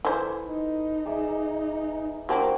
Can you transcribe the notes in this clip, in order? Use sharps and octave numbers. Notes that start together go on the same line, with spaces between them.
E3 A4 B4 C5
D#4
G#4 D5 E5
E3 A#3 D4 F#4 G4 C5